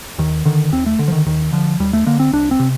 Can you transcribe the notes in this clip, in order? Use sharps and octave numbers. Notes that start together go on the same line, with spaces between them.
D#2 D#3
D3 D#3
D#2 C4
A3
D3
F3
D#3
D#2 D#3
D3 F3
D#2 G3
A3
D3 A#3
C4
C2 D4
C4
C3